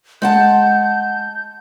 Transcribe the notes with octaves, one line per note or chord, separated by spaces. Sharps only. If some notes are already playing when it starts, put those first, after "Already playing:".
G#3 F#5 A5 G6